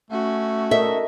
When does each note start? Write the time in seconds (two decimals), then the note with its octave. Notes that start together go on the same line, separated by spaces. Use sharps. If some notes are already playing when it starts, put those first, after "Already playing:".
0.11 A3 C#4 F#4
0.71 A4 A#4 D#5 E5